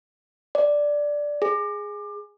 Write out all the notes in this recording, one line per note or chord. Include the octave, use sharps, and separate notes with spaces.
D5
G#4